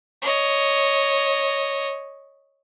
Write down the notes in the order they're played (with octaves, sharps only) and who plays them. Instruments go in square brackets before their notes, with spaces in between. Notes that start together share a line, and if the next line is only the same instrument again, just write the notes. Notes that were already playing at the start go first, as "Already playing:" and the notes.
[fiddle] C#5 D#5